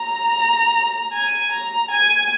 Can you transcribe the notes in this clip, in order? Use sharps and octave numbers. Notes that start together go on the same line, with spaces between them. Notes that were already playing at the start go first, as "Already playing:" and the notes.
Already playing: A#5
G#5
A#5
G#5